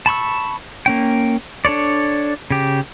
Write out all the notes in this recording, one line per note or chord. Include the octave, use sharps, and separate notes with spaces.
A5 B5 C#6 E6
A#3 C#4 G5
D4 A4 C#5 D5
C#3 G4